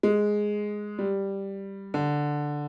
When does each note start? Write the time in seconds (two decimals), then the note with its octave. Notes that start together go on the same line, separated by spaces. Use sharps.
0.03 G#3
0.99 G3
1.94 D3